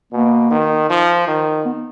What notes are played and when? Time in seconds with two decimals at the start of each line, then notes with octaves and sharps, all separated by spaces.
0.13 B2 A#3
0.51 D#3
0.90 F3
1.28 D#3
1.65 B3